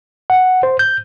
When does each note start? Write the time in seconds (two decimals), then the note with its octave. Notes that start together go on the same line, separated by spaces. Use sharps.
0.30 F#5
0.63 C5
0.79 G6